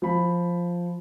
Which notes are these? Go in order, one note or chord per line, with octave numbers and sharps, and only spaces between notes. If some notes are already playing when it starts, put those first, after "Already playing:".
F3 B5